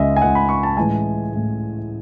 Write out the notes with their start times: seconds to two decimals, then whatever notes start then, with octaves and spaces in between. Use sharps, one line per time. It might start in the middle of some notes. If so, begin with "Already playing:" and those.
Already playing: C#2 C#3 G#3 D#5 E5
0.17 G#5
0.22 C#2 C#3 G#3 F#5
0.35 B5
0.49 C#6
0.63 A5
0.77 A2 E3 G#3 G#5
1.32 A2 E3 G#3